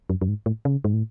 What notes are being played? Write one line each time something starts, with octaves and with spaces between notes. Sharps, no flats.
F#2
F#2
G#2
A2
C#3
G#2
A2